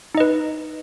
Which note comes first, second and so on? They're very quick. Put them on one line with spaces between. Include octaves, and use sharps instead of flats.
D#4 D#5 B4